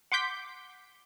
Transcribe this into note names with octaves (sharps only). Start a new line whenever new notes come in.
F#5 C6 D6 G6 B6